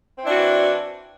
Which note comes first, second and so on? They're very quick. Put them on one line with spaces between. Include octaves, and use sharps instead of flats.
C4 E4 D4 F#4 E3